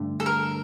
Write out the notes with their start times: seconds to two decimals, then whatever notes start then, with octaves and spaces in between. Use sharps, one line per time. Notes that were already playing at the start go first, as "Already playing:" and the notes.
Already playing: G2 D3 A3 D4
0.20 A4
0.26 A#4